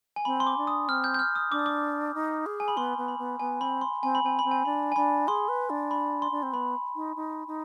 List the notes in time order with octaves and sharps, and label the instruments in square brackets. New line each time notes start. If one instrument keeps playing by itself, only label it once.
[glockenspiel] G#5
[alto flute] C4 [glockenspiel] B5
[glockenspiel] C6
D6
[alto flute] D4
[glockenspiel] D#6
[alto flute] C4 [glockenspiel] F6
[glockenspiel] G6
G6
F6
D#6
[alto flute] D4 [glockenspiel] D6
[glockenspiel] D#6
D6
[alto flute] D#4
G#4
[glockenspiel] G#5
B5
[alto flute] B3 [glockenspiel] C6
[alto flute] B3
[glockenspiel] B5
[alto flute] B3
[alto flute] B3 [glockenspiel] G#5
[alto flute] C4 [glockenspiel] B5
[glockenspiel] C6
[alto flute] C4 [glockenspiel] G#5
[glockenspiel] B5
[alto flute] C4 [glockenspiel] G#5
[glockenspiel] B5
[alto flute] C4
[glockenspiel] G#5
[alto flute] D4 [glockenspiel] B5
[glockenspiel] G#5
[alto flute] D4 [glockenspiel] B5
[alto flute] G#4 [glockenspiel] C6
[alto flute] B4
D4
[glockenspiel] B5
C6
[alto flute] D4
C4
[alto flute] B3 [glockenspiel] B5
[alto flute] D#4
D#4
D#4